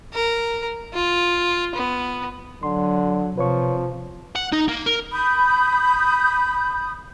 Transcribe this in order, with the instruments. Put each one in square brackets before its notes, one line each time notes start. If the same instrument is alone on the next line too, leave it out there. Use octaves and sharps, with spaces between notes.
[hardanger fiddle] A#4
F4
B3
[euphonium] D3 [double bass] F#3 [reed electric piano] C6
[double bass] C3 [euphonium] F3 [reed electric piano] B4 C#5 C#6
[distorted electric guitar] F#5
D#4
A#3
A#4
[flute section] B5 D#6 G6